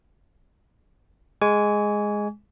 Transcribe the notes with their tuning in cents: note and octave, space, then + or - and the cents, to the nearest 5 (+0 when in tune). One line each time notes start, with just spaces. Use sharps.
G#3 +0 G#5 +0 C#6 +45